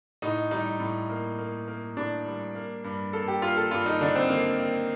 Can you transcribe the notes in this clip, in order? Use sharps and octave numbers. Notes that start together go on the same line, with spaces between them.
A2 D#4
G3 D#4
A2
A#3
A#3
A#3
A2 D4
G3
A#3
G2
A#3 A4
G4
A#3 F4
A4
G2 F4
D#4
D3 D4
C4
D3 A#3
A#3